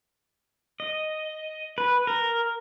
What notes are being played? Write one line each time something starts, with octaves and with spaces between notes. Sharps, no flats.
D#5
B4
A#4